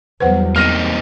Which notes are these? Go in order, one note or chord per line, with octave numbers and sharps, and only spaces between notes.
E2 F#3 G3 B4 C5 F#5
A#3 C4 D#4 F6 A#6 D#7